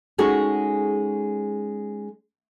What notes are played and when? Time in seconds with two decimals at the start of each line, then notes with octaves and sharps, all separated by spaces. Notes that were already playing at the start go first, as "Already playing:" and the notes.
0.18 G#3 C#4 D#4 F#4 G#4 A4